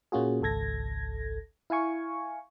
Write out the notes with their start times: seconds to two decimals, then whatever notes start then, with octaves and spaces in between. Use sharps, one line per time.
0.12 A#2 A#3 C#4 F4 F#4 G#4
0.42 G#1 C#2 A4 G#6 A#6
1.70 E4 F5 G#5 C#6